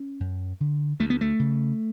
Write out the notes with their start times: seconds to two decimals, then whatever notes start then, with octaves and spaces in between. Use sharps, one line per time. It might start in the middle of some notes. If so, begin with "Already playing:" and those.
Already playing: C#4
0.20 F#2
0.60 D3
1.00 D2 A3
1.10 B3
1.21 A3
1.39 C#3